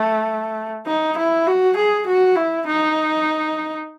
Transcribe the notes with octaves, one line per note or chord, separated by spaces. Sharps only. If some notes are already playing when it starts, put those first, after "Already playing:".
Already playing: A3
D#4
E4
F#4
G#4
F#4
E4
D#4